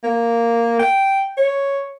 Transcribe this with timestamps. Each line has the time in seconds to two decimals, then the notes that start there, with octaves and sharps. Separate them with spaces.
0.04 A#3
0.79 G5
1.37 C#5